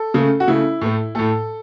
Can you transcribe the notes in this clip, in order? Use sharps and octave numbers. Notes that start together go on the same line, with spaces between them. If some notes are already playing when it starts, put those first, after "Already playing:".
Already playing: A4
C#3 A3
F#4
C#3 A3 E4
A2 A3
A2 A3 A4